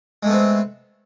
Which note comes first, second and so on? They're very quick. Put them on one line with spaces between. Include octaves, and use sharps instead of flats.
G#3 A3 B3 C4